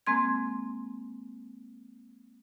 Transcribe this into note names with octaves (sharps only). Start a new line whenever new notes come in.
G#3 A#3 C4 C6 G#6